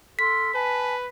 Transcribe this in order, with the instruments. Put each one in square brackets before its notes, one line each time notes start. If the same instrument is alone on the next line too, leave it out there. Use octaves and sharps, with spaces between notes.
[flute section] A4 C6 F6 [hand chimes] B6
[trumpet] B4 [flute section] G#5 A5